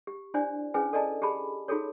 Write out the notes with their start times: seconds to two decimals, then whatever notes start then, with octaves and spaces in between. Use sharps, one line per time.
0.07 G4
0.34 D4 E4 C5 D5 G#5
0.74 C#4 E4 G#4 B4 C5 G#5
0.93 A4 D5 D#5 G#5 A5
1.22 G4 G#4 A5 B5
1.68 D#4 F4 F#4 G#4 A4 C#5